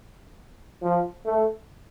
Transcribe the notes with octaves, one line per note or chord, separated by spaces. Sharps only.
F3
A3